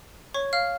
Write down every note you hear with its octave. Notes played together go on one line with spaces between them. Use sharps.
C#5 C#6
F5 F6